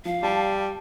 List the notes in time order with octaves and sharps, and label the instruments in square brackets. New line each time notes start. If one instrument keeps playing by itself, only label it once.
[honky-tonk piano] F3 [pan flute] F5
[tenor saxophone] G3 [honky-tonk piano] A5